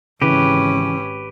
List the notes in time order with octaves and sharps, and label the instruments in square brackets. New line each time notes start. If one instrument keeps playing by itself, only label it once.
[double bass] G#1 C#4 [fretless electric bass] C#3 E3 [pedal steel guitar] G4 B4